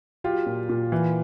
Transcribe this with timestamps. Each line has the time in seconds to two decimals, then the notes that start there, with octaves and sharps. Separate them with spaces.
0.24 F#3 F4 G4
0.46 A#2
0.69 A#2
0.92 E3